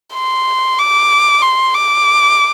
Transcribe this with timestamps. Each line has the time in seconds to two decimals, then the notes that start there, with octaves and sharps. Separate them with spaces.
0.14 C6
0.78 D6
1.42 C6
1.75 D6